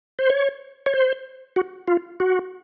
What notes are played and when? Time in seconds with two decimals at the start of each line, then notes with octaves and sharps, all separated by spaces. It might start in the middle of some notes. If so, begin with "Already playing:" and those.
0.19 C5
0.30 C#5
0.86 C#5
0.94 C5
1.56 F#4
1.88 F4
2.20 F#4